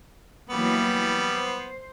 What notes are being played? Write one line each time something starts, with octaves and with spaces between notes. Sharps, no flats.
E3 F#3 G3 A#3 B3
C5